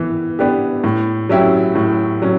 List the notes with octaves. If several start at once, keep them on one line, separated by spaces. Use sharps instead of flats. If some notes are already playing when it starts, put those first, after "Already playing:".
Already playing: E3 B3
B3 D4 G4
A2
F#3 C#4 E4 G4
A2
F#3 C#4